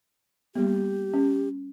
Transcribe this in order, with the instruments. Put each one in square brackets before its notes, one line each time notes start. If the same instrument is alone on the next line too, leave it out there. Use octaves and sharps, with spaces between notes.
[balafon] G3 A#3 B3 [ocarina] G4
[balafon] C#4